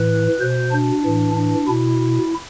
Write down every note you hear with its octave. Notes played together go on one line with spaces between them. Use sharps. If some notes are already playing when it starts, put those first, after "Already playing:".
Already playing: A2 E3 B4
B2 C5
D4
A2 E3
D4
B2 E4